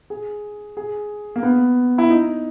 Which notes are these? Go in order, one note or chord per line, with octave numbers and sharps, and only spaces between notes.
G#4
G#4
A#3
B3
E4
D#4